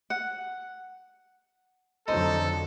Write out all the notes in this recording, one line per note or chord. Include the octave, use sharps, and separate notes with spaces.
F#5
F2 D3 F#3 D#4 A4 C5